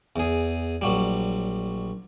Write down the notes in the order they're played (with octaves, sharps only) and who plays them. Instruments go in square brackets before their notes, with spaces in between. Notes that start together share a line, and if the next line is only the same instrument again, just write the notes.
[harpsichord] E2 G#4
A#1 F#3 G3